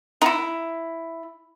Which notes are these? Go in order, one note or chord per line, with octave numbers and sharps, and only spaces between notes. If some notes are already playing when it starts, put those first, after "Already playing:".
D#4 E4